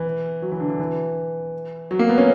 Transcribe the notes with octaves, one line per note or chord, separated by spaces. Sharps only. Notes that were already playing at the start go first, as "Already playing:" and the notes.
Already playing: E3
F#3
E3
D3
D3
E3
F#3
A#3
B3
C#4